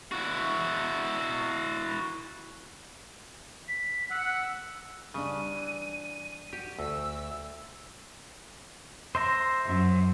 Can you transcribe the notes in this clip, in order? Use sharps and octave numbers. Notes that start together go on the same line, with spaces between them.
E4 F#4
B6
F#5 E6
C#3 G3 D4 D#7
E3
F#4 G4
D2 E6
C5 E5 A#5
F#2